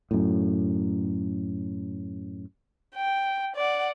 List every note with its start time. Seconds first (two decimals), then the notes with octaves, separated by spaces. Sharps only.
0.11 F#2 A2
2.95 G5
3.56 D5 F#5